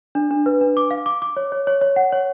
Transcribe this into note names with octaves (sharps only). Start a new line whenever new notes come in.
D4
D4
B4
D4
D6
F5
D6
D6
C#5
C#5
C#5
C#5
F#5
C#5